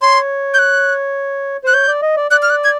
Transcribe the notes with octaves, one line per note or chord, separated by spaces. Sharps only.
C#5 C6
G6
F#6
C5 F#6
C#5 G6
D5
D#5
D5
D5 F#6
F6
F#6
G#6